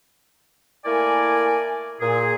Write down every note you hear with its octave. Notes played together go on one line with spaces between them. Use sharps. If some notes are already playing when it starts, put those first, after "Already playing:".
A3 A#3 E4 A#4 D5 G#5
A#2 G#4